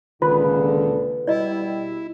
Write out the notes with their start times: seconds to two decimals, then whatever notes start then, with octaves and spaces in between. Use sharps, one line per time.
0.22 C#2 A#2 D3 D#3 F4 B4
1.27 B2 G3 E4 D5 D#5